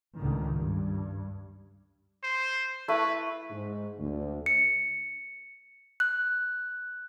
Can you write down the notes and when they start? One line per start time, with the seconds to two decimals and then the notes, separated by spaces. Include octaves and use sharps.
0.17 C#2 A2 D3 D#3
0.50 G2
2.23 C5
2.88 A3 E4 B4
3.51 G#2
3.98 D2
4.46 C#7
6.00 F#6